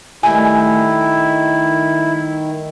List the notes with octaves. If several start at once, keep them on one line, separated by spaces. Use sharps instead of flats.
D#3 G3 A3 E4 G#5